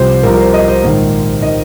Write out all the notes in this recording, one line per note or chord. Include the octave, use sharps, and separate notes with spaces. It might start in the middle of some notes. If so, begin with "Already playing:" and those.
Already playing: C2 C3 F3 C5
C2 C3 F3 A#4
A#4
C5
D#5
C5
A#1 G#2 D#3
D#3 D#5